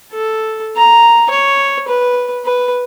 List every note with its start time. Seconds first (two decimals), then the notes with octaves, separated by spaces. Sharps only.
0.12 A4
0.76 A#5
1.30 C#5
1.88 B4
2.45 B4